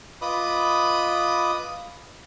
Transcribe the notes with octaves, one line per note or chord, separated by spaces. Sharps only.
F4 B4 D#5 B5 D6 D#6